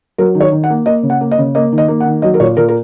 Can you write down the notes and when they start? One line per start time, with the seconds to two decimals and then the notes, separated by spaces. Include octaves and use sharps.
0.18 F#3 A#4
0.35 D#3
0.40 C#5
0.52 D#3
0.64 F#5
0.70 A#3
0.86 A#3 D#5
1.03 C#3
1.10 F#5
1.21 A#3
1.31 D#5
1.38 C#3
1.55 A#3 D#5
1.72 D#3
1.78 D#5
1.88 A#3
2.00 F#5
2.05 D#3
2.22 F#3 D#5
2.34 A#4
2.40 A#2 C#5
2.57 A#2 A#4
2.68 A#4